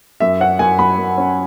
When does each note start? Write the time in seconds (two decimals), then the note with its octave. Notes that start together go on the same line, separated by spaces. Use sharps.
0.20 F#2 E5
0.40 C#4 F#5
0.59 F#2 G#5
0.79 F#3 B5
0.99 F#2
1.18 C#4